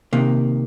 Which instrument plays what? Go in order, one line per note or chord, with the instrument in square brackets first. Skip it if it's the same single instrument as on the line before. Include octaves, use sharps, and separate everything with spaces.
[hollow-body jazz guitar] C3 D#3 A#3